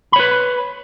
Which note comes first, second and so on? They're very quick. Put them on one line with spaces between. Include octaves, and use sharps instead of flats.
B5 C#5 B4